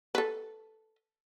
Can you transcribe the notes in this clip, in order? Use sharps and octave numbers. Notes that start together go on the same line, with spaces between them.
A4 B4